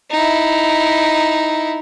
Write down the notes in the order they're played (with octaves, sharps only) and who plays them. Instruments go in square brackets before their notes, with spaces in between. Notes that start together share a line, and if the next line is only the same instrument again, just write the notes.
[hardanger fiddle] D#4 E4